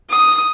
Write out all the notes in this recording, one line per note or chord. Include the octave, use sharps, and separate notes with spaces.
D#6